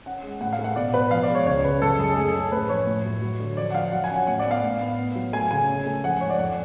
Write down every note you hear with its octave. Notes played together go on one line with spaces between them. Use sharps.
C#4 F#5
G#3
A2 F#5
F5
A3
F#5
B2 D5
B2 B4
F3 F5
D5
G#3
C#5
C#2 C#5
C#3 B4
F#2 A4
F#2 G#4
A3 G#4
A4
C#4
A4
A2 B4
F3 C#5
A2
F#3
F#3
D3
F3 D5
F#5
F3 F5
F#3 F#5
G#5
C#4
F#5
A2 F#5
D5
B3 F5
A2
B3
B3
F#3
A3 G#5
C#3 G#5
C#4
A3
F3 F#5
G#2 C#5
D5
F2 F#5